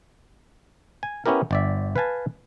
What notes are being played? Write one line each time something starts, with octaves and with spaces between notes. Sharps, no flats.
G#5
B3 C#4 E4 G4 A#4
G1 D5 E5
B4 F5 G#5 A5